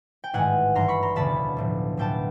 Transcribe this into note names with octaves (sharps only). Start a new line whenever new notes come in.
G5
A1 G#2 D#3 G#3 F#5 G#5
G#1 G2 E3 A#5 C6
B5 C#6
A#5 C6
E1 D2 C#3 A5 B5
B1 A2 F3
B1 A2 F#3 B3 G5 A5